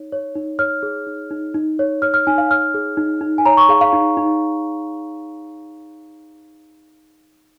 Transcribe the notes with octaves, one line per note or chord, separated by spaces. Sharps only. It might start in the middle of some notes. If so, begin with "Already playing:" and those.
Already playing: D#4 C#5
C#5
D#4
C#5 F6
G#4
D#4
D#4
D#4
C#5
C#5 F6
F6
D#4 G#5
F5
C#5 F6
G#4
D#4
D#4
G#5
C#5 A#5
C#6
G#4 F5
F5
D#4
D#4